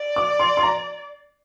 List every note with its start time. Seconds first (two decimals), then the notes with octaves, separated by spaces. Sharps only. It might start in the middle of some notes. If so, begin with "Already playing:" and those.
Already playing: D5
0.16 D6
0.40 C6
0.57 C6
0.63 A#5